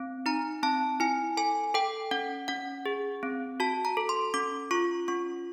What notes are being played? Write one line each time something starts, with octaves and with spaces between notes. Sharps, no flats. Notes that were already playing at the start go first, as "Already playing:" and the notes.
Already playing: C4
D#4 A#5
C4 A5
E4 G#5
A4 G#5
A4 G5
C#4 F#5
C#4 F#5
G#4
C4
F#4 A5
A#5
A4
C6
C#4 D6
F4 C#6
C#4 C#6